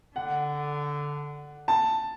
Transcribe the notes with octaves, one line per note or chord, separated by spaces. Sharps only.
D3 F#5
A5